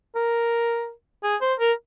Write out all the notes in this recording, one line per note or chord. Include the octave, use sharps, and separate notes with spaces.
A#4
G#4
C5
A#4